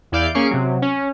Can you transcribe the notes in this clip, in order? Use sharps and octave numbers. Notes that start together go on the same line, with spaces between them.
E2 E4 D5 F5 G6 D7
A#3 C#4 G#4 C#6 C7 D7
C3 F#3
C#4